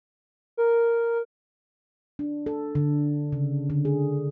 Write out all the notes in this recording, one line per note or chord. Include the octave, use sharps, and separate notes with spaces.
A#4
D4
A4
D3
C#3
D3
G#4